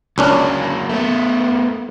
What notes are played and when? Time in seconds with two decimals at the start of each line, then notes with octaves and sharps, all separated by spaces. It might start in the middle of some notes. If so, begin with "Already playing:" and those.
0.18 C#2 F#3 A#3 C#4 D4
0.89 A3 B3